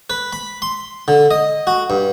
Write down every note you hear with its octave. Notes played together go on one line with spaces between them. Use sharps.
B4
B5
C6
D3
D#5
F#4
G2